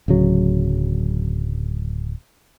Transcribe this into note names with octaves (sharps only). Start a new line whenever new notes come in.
D1 C#3 F#3